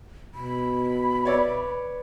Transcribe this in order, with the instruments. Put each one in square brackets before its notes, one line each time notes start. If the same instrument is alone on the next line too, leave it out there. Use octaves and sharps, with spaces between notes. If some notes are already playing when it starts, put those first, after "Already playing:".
[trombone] B2 [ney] B5
[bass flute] B4 [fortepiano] C#5 D5 E5